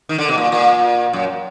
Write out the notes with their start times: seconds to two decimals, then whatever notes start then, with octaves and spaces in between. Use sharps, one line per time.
0.09 D#3
0.18 D3
0.29 B2
0.38 A#2
0.52 A#2
1.13 F#2